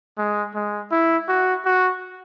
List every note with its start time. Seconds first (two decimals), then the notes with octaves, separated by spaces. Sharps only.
0.17 G#3
0.55 G#3
0.91 E4
1.28 F#4
1.65 F#4